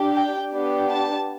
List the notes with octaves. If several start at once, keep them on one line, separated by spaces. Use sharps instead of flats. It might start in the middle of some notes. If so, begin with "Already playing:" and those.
Already playing: D4 G4
G5
B3 D4 G4
A5